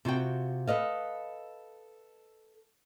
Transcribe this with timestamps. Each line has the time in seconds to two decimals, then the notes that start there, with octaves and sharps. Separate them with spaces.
0.05 C3 F4 F#4 G5
0.67 A4 B4 D#5 F5